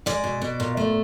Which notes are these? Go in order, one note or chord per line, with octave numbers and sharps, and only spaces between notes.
G#3 D5
B2
B2
A#2
A3